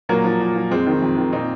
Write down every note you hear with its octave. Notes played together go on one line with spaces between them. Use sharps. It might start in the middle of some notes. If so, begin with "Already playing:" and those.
A#2 F#3 A#3
F3
A#2
F3
F2 G#3 C4
D#3
F2
D#3
A#2 C4 D#4